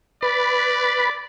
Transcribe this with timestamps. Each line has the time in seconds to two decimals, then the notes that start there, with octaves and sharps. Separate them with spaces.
0.23 B4 D5 B5